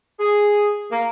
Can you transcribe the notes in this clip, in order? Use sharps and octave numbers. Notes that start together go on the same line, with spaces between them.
G#4
A#3